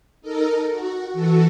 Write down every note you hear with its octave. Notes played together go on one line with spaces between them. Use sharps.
D#4 A4 A#4
F#4
E3 F#4 A4